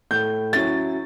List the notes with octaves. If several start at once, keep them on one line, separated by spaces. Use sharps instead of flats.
A2 G6
F#3 C#4 E4 A6